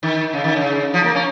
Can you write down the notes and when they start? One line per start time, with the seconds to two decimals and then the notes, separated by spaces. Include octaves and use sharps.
0.03 D#3
0.33 C#3
0.44 D#3
0.56 C#3
0.94 F3
1.04 A#3
1.15 C#4